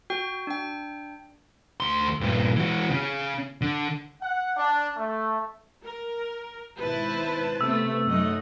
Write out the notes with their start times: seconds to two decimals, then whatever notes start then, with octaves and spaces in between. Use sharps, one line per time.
0.10 F#4 G5
0.47 D4 G5
1.80 D2 C6
2.21 G2 A#2
2.57 E3 F#4
2.90 C#3 C#4
3.61 D3
4.22 F#5
4.57 D4
4.97 A3
5.85 A#4
6.78 G#1 B2 E4 B4 C5 A5
7.61 C3 A3 B3 E6
8.07 F#2 A3 D#4 D#5 F#5